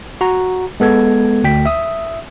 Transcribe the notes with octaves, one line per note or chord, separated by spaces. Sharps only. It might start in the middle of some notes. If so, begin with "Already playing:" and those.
F#4 A#5
G#3 B3 A4 G#6
D2 G5 B6
E5 D#6